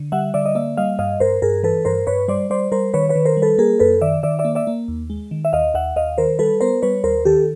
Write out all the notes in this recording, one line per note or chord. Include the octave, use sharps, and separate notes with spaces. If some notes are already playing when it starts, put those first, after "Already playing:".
Already playing: D3
G3 E5 F#5
D3 D5 E5
D#5
A#3 D5 E5
G3 D#5 F5
G2 D#5 F5
G2 A#4 C5
G2 G#4 A#4
E3 A4 B4
G2 A#4 C5
G2 B4 C#5
G3 C5 D5
G3 C5 D5
G3 A#4 C5
D#3 B4 C#5
B4 C#5
D#3
A#4 C5
G3
A4 B4
A#3 G#4 A#4
F#2 A4 B4
D#3 D5 E5
D#3 D5 E5
D5 E5
A#3
D5 E5
A#3
D#2
G#3
D#3
E5
D#2 D#5 F5
D#2 E5 F#5
D#2 D#5 F5
D#3 A#4 C5
G3 A4 B4
B3 A#4 C5
G3 B4 C#5
D#2 A#4 C5
D#3 G4 A4